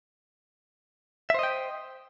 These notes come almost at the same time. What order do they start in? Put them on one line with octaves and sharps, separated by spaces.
E5 C5 D#5 G5